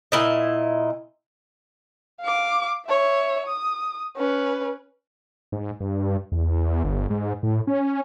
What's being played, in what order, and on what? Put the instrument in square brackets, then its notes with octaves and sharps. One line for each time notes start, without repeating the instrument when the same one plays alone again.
[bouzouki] A#2 E4 D#5
[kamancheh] F5 D6
C#5 E5
D#6
C#4 B4
[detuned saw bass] G#2
G2
E2
G1
G#2
A2
C#4